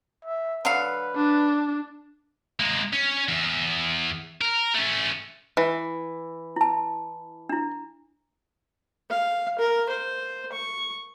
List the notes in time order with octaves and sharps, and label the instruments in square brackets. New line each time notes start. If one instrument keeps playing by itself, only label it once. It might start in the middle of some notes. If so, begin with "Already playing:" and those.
[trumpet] E5
[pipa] D3 F#3 F5 [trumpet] B4
[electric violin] D4
[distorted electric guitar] G#3 A#3
C#4
E2
A#4
A3 C#4
[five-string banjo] E3
[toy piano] E4 A5
D4 E4
[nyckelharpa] F5
A#4
C5
C#6